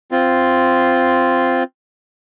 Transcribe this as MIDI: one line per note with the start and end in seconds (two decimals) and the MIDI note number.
0.12 1.63 60
0.12 1.63 65